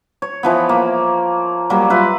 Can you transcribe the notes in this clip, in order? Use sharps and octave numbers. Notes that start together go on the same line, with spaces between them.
C#5
E3 F3 B3
A#3
F#3 G3 A#3
F4 B4 E5